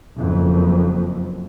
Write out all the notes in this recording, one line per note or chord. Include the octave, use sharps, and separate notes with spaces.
F#1 F2